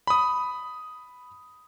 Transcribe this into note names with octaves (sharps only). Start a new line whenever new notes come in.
B5 D#6